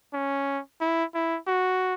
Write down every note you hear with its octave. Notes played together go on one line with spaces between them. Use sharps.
C#4
E4
E4
F#4